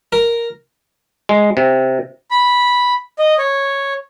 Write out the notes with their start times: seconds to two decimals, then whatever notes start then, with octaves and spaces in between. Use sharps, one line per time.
0.12 A#4
1.29 G#3
1.57 C3
2.31 B5
3.19 D#5
3.38 C#5